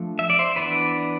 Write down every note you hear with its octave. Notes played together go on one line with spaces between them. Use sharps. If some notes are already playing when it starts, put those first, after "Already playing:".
Already playing: F3 A3 D4
E5
D5
C5 E5
E3 B3 D4 B4 D5